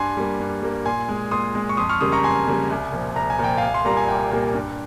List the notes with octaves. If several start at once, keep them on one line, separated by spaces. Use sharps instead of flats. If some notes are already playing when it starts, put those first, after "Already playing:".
Already playing: G2 G#5 C6
G3 A#3
G2
G3 A#3
A#2 G#5 C6
G#3
A#2 C6 D#6
G#3
C#6
F2 C6 D#6
C#6 F6
C#3 G3 A#3 C6 D#6
A#5 C#6
F2 G#5 C6
C#3 G3 A#3
C2
A#2 F3
C2 A#5
G#5
A#2 F3 G5
C2 F5 G#5
C6
A#2 G3 A#3 A#5
G#5
C2 G5
A#2 G3 A#3
G2